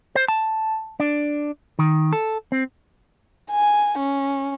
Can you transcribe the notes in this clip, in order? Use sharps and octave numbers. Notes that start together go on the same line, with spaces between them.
C5
A5
D4
D#3
A4
C4
G#5
C#4